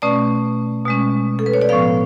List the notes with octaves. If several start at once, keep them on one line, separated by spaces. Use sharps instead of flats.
B2 A3 C#4 D5
B2 G#3 C#4
A4
B4
C#5
D5
A2 F3 B3 F5